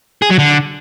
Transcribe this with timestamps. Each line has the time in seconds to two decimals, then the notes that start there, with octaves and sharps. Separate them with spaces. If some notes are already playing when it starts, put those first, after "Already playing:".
0.22 G#4
0.30 F#3
0.39 D3